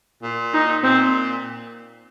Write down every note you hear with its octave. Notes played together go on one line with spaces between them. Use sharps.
A#2
D#4
A#2 C4